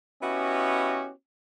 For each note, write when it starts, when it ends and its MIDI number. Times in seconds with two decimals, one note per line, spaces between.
0.22 1.10 59
0.22 1.10 61
0.22 1.10 64
0.22 1.10 66
0.22 1.10 67
0.22 1.10 75